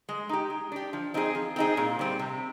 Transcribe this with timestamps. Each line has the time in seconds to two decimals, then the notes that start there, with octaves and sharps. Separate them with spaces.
0.09 G#3
0.29 D#4 G4
0.50 G#3
0.72 D4 G4
0.93 F3
1.14 C4 D#4 G#4
1.35 F3
1.56 C4 D#4 G#4
1.77 A#2
1.99 G3 C4
2.19 C3